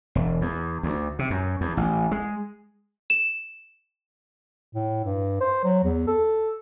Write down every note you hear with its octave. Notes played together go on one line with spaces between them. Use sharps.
E1
E2
D2
C3
F#2
E2
A1
G#3
E7
A2
G2
C5
F#3
E2
A4